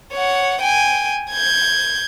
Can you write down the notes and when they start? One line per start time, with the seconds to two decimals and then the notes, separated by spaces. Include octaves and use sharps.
0.13 C#5 F#5
0.62 G5 G#5
1.31 G6 G#6